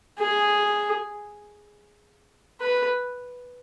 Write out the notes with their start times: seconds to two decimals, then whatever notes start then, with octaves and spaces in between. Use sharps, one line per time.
0.19 G#4
2.61 B4